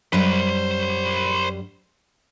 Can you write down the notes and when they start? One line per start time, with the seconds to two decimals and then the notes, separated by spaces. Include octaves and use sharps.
0.13 F#2 G3 C5 B5